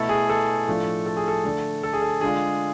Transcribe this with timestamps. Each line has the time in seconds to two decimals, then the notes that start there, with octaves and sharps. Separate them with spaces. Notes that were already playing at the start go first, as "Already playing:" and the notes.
Already playing: B2 A3 E4 A4
0.09 G#4
0.29 A4
0.68 A2 F3 A3 D4 F4
1.06 A4
1.17 G#4
1.28 A4
1.45 D3 A3 D4
1.83 A4
1.93 G#4
2.02 A4
2.21 D3 G#3 D4 F4 G#4